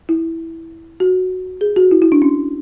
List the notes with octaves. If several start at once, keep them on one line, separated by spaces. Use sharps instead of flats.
E4
F#4
G#4
F#4
E4
E4
D4
C#4